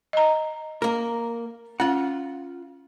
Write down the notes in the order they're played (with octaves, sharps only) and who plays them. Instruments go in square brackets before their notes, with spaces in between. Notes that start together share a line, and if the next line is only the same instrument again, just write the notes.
[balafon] D#5 A#5
[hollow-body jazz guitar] A#3 A#4
[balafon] C#4 [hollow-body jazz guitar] F4 F#5